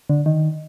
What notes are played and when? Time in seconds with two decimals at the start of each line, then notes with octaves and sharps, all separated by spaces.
0.09 D3
0.26 D#3